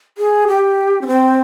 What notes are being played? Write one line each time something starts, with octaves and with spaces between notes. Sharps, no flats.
G#4
G4
C#4
C4